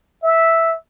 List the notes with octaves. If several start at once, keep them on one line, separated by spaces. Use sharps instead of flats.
E5